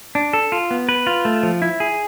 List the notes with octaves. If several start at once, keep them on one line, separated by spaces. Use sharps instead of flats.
D4
A4
F4
B3
B4
F4
A3
F3
E4
G#4